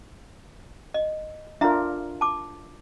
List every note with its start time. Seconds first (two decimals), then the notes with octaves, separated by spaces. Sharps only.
0.94 D#5
1.61 D4 F4 A#4 E5 A#5
2.21 A5 D6